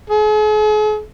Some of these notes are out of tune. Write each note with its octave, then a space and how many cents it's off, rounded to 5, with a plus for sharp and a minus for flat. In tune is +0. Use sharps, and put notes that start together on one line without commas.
G#4 +45